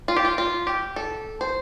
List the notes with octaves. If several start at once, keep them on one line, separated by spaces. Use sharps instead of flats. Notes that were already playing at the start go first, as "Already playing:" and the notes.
F4
G4
F4
F4
G4
A4
C5